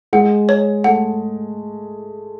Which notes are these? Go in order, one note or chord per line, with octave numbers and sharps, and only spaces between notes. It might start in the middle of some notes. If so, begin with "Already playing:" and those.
G#3 F#5
C#5
A3 F#5